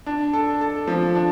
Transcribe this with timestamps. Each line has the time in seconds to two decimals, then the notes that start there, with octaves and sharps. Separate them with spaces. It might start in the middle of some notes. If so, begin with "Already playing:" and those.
0.06 D4
0.33 A4
0.61 A4
0.88 F3
1.15 D4